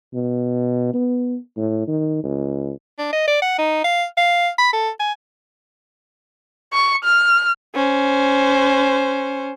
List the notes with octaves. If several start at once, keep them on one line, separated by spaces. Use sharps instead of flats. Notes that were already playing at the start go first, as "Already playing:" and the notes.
B2
B3
A2
D#3
C#2
D4
D#5
D5
F#5
D#4
F5
F5
B5
A4
G#5
C#6
F6
C#4 C5